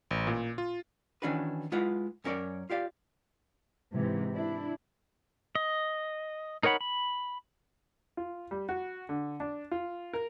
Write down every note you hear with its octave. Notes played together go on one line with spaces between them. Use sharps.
A1
A#2
F4
D#3 E3 C#4 D4 F#4 B4
G#3 E4 F4 B4 F#5
F#2 C#4 A#4 C#5 D5
F4 G4 D5 F5
G#2 C3 E3
D4 E4
D#5
D#4 A#4 C#5 F#5 B5
B5
F4
G3
F#4
D3
D4
F4
A#4